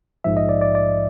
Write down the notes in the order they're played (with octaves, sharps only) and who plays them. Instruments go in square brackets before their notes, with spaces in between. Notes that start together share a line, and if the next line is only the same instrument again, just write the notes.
[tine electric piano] A#1 G#2 F3 E5
D#5
D5
D5
D5